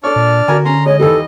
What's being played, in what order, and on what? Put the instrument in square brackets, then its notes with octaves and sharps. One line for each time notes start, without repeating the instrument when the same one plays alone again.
[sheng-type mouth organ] D4 D5 F6 [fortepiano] A4 C#5
[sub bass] A#2
[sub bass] D3 [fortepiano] F#4 A#4 G#5
[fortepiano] C#4 [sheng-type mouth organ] A#5 C6
[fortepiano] G#3 [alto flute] C#5 [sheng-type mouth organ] D#5
[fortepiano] D#2 E3 G3 [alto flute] A4